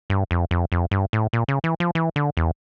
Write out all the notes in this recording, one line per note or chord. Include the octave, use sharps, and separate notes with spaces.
G2
F2
F2
F2
G2
A2
A#2
C#3
E3
F3
E3
D3
E2